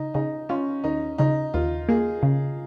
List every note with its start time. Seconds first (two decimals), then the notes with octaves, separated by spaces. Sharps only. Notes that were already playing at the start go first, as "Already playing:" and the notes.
Already playing: C#3 D#4
0.14 C#3 D#4
0.49 C#4 F4
0.84 D#2 D#4
1.18 C#3 D#4
1.54 D#2 F4
1.89 A#3 G#4
2.23 C#3